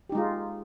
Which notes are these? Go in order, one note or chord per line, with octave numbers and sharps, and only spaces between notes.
G#3 D#4 F4 G4